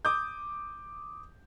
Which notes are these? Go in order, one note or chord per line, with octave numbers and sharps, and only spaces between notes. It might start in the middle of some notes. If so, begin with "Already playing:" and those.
D6 D#6 G6